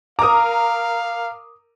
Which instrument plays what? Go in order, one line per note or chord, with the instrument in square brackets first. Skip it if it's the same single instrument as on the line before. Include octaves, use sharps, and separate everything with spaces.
[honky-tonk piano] A#4 A#5 [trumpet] F5 [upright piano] D6 D#6